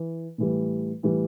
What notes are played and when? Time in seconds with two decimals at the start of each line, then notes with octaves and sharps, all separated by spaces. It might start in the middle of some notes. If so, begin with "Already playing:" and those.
Already playing: E3
0.38 A2 E3 G3
1.03 A2 E3 G3